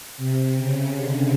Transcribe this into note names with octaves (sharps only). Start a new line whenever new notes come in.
C3
C#3
D3